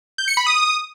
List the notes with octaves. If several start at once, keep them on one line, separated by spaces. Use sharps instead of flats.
G6
C#7
B5
D#6